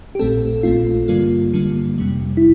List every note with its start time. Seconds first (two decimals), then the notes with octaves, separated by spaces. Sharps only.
0.15 G4
0.19 A#1 A#2 A3 C4 A4
0.63 A#1 A#2 A3 C4 F4
1.08 G2 D3 G3 A#3 F4
1.54 G2 D3 G3 A#3
1.98 F2 C3 G3
2.37 E4